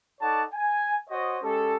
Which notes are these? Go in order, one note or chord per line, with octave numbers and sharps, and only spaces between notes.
D#4 A4 C#5 D5 F#5 A5
G#5
F#4 C5 C#5 D#5
G#3 C#4 G4 A4